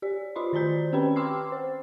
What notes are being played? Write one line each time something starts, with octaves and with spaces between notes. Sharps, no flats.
G4 D5
F4 F#4 D#5 B5 C6
D#3 C5 D5 A#5 G6
C4 C#4 G4 B4 G5 B5
G5 C6 D6 E6 F6 C7
C5